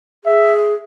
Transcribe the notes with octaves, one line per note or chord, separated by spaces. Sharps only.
G#4 E5